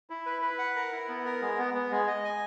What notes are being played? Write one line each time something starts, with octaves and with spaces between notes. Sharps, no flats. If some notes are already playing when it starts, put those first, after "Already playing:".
E4
B4
B4
F#5
A#4
E4
B3
A#4
G#3
B3
B3
G#3
D#5
G#5